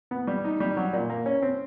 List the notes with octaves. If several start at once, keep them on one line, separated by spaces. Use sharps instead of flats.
B3
G3
D#4
G3
F#3
A#2
A#3
C#4
C4